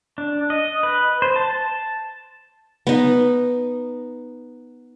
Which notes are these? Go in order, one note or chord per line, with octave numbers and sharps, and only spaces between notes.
D4
D#5
B4
C5
A5
B3 D#4